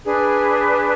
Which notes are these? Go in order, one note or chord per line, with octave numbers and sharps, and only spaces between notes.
D4 G#4 B4